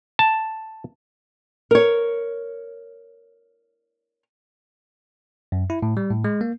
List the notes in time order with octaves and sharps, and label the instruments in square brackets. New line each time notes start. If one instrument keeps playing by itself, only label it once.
[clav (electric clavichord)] A5
[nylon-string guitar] A#4 C#5
[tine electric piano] F#2
E4
A2
G3
A2
G#3
A#3